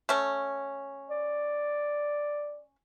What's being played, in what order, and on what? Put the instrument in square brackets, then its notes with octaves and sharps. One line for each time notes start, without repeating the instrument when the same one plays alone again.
[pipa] A3 C#4
[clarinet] D5